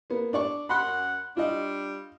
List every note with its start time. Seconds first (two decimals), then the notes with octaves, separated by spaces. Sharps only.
0.10 A#3 B3
0.33 D4 D5 C#6
0.69 F#2 F#5 B5 C6 F#6
1.37 G3 D4 F4 D#5